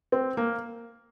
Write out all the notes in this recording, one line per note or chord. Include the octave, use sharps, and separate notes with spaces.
C4
A#3